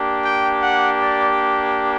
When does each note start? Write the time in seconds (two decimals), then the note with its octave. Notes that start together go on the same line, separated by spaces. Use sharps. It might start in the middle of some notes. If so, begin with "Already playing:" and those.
Already playing: A#3 D4 G4
0.23 G5
0.62 F#5
1.00 D5